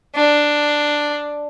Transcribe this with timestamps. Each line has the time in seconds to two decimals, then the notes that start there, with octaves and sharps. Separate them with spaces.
0.15 D4